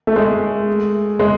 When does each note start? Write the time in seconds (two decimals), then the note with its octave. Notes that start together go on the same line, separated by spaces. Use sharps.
0.07 A3
0.16 G#3
1.19 G#3